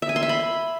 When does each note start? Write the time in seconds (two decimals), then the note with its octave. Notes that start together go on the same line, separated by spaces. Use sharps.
0.02 E5
0.09 G#5
0.16 C6
0.23 E5
0.29 B5